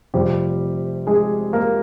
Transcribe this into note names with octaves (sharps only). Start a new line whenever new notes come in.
F1 F2 C3 F3 G3 G4
G#3 G#4
A#3 A#4